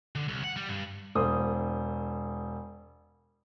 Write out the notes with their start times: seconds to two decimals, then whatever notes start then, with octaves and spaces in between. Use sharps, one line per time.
0.15 D3
0.28 C2
0.44 F#5
0.56 G3
0.69 G2
1.15 E1 C5 D#6